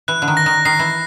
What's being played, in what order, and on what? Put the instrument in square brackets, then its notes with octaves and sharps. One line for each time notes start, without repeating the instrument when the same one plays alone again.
[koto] E3 [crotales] F#6
[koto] D3
D#3
[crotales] A#6
[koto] D#3
[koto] D#3 [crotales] C7
[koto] E3